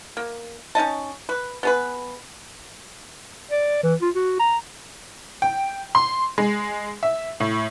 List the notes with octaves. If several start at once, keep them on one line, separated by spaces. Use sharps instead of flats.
A#3
C#4 D#4 D#5 A5
B4
B3 G#4 B4
D5
E3
F4
F#4
A#5
G5
C6
G#3
E5
A2